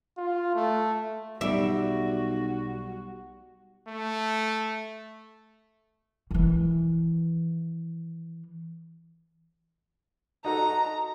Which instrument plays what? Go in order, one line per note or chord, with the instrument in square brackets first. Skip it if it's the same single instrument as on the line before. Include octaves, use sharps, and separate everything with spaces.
[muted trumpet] F4
A3
[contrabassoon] B1 [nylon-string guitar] G3 D5 [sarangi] F#4 [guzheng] E5
[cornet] A3
[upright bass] D#3 E3
[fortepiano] D#4 F#4 A4 [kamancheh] A#5